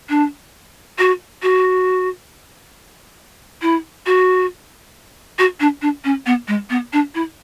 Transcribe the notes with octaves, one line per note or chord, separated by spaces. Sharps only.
D4
F#4
F#4
E4
F#4
F#4
D4
D4
C#4
B3
G#3
B3
D4
E4